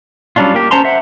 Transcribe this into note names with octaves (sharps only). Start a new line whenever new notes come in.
F#3 G3 C#4 D4 F4
A#3 G4
C#4 C5 A5 A#5 C6
C5 E5 F#5